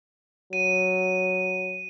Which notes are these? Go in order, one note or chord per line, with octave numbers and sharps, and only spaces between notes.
F#3 D#7